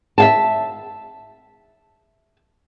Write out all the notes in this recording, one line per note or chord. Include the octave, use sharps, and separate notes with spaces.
E5 F5 A5